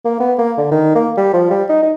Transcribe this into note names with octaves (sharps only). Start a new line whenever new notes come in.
A#3
B3
A#3
D3
D#3
A#3
G3
F3
G3
D#4
D#4